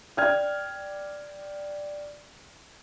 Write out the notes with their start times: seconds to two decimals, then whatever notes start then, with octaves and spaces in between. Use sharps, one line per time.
0.17 D5 G5 F6 G#6